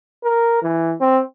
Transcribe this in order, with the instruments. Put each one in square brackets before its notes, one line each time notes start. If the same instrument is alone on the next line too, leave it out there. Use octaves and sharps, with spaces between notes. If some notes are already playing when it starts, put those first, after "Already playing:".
[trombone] A#4
E3
C4